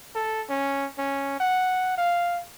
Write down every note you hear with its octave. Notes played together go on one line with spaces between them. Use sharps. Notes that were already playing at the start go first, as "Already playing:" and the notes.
A4
C#4
C#4
F#5
F5